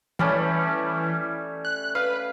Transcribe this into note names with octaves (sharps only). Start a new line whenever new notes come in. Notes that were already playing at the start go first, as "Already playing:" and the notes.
E3 G3 A3 C#4
F#6
B4 F5